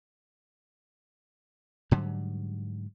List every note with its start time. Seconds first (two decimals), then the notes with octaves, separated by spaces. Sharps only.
1.91 G#2 D3 F#3 G3